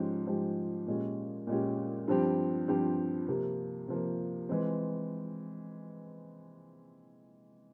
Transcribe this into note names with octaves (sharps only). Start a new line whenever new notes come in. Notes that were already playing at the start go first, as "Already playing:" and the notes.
Already playing: G#2 F3 G#3 C#4 G4
G#2 F3 G#3 C#4 G4
A#2 G#3 C#4 G4
A#2 G#3 C#4 G4
G2 F3 C4 G4
G2 F3 C4 G4
C3 F3 A#3
C3 F3 A#3
E3 G#3 C4